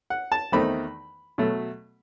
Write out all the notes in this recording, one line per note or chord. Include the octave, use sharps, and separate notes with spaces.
F#5
A5
E2 D#3 A3 C4 D#4 B5
B2 F#3 A3